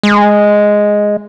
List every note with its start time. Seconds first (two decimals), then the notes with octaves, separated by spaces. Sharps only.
0.03 G#3